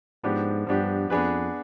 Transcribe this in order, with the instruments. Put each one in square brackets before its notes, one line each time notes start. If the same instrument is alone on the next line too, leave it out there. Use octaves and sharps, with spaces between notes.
[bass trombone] G#2 [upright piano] F3 B3 D4 G4
[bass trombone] G2 [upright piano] F3 B3 D4 G4
[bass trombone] F2 [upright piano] B3 D4 G#4 B4